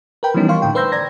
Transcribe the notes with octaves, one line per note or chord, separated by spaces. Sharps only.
A#4 B4 G5 B5
E3 F3 G3 B3 C#4 D#4
D#4 A#4 F5 C6 C#6
A2 D3 G5
B4 C5 C6 E6 G6 A#6
D5 A#5 G#6 A#6